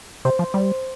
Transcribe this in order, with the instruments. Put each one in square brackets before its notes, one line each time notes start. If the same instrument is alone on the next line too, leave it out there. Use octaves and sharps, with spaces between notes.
[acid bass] C3 [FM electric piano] C5
[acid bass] F3
G3